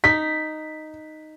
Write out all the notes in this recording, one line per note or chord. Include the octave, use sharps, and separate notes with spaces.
D#4 B6